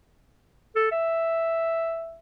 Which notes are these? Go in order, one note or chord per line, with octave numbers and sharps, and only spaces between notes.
A4
E5